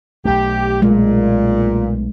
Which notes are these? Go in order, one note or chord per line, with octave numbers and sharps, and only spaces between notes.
B1 A3 G4
A#2 G#3